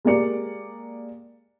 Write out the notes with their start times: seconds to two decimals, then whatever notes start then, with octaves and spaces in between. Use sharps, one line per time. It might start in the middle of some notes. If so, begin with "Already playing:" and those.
0.05 G#3 A#3 G4 D5 C#7